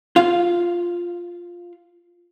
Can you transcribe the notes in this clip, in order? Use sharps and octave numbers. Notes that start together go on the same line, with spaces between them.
F4 F5